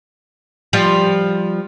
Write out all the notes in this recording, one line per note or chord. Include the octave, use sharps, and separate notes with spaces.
F3 G3